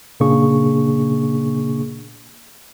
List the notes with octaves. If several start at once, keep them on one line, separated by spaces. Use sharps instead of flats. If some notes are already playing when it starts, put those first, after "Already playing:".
A#2 C#3 A#3 D4 G#4 C#6